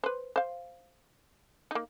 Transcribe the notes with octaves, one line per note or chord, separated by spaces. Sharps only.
B4 C5
C5 F5
A#3 D#4